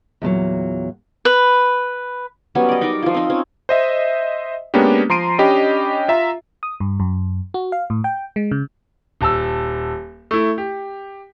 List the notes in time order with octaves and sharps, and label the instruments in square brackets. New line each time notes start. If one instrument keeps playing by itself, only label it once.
[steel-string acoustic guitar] E2 A#2 D3 F#3
[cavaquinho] B4
[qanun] F#3 G3 B3 C#4
D5 D#5
D#4 A#4 D5 D6
F3 F4
C4 D#4
C4 C#4
[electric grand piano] C5 D#5 E5
G#3 A#3 B3 C#4 D4 G4
F3 A#5 C6 C7 D7 D#7
C#4 D4 G4 D#5 B5
F4 E5 A#5
[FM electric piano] D#6
G2
F#2
F#4
F5
A2
G5
G#3
C#3
[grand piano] D#1 A5 E6
A3 E4
G4